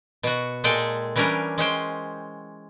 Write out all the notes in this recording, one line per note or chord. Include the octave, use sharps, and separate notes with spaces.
B2 F#4
A#2 G#3 G#4 A4 G5
E3 G3 C#4 D4 A#4 A#5
G#3 C#4 C5 G5